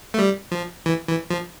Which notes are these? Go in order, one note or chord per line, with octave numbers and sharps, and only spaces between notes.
A3
G3
F3
E3
E3
F3